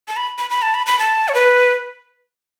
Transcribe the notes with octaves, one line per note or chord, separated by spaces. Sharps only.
A5
B5
B5
B5
A5
B5
B5
A5
C#5
B4